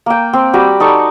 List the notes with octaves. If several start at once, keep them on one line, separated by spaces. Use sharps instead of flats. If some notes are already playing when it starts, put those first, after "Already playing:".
A#3 G5
C4
G3 F#4 B5
D#4 A4 D5 C#6